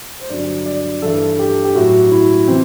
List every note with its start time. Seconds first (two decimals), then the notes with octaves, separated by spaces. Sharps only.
0.20 C5
0.29 G2 D3 F#3 D5
0.66 D5
1.02 G2 E3 A4
1.39 G4
1.65 G4
1.75 A2 F#3 F#4
2.12 E4
2.48 C3 E3 C4